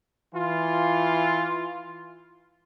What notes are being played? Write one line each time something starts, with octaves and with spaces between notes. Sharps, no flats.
E3 F4